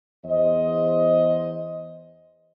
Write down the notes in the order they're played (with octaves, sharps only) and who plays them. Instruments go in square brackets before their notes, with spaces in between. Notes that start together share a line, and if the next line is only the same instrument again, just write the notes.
[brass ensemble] E2 C5 D#5